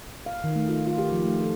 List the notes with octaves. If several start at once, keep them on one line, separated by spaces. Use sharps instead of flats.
F5
D#3
A3
F4
F4
G4
F3
A3
A4